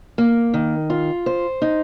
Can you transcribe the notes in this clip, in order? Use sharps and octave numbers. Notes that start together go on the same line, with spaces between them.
A#3
D#3
F4
C5
D#4